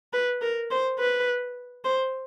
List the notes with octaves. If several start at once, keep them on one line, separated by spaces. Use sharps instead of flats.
B4
A#4
C5
B4
C5